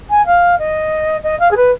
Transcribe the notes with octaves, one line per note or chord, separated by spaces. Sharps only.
G#5
F5
D#5
D#5
F5
G#4
B4